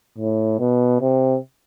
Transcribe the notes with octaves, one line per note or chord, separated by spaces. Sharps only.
A2
B2
C3